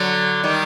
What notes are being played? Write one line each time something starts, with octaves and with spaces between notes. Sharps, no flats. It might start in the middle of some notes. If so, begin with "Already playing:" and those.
Already playing: D3 F#3
D#3 G3